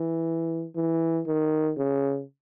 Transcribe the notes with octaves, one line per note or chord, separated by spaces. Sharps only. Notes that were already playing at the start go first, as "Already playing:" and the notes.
Already playing: E3
E3
D#3
C#3